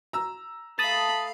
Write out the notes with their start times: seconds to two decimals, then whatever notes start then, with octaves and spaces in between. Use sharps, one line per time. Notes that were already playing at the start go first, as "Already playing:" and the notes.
0.13 A#5 E6
0.79 A3 F5 A5 B5 D#6